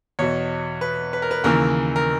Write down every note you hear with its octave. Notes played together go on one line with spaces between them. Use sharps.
E2 B2 C#5
B4
B4
A#4
B4
D#2 C#3 E3 A#4
A#4